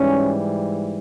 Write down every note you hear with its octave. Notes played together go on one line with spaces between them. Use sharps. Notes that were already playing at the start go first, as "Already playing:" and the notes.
Already playing: G#2 E3 G3 C#4